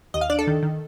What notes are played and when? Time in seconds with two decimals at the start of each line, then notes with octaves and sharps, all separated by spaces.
0.14 D#2 D#5
0.21 F5
0.30 D4 D5
0.39 A4
0.47 D#3
0.63 D#3